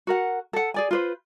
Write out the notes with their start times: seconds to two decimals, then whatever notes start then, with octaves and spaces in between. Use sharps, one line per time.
0.07 F#4 A#4 F#5
0.53 A4 F#5
0.74 G#4 D5 G#5
0.91 F4 B4 C5